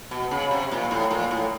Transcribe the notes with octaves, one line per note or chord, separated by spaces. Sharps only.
B2
C#3
C3
A#2
A2
A#2
A2